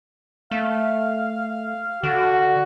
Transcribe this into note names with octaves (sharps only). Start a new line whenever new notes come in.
A3 F5
D3 F#4